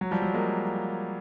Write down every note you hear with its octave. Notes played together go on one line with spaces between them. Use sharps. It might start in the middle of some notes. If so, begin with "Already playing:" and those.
F#3
F3 G3
F#3
G#3 A#3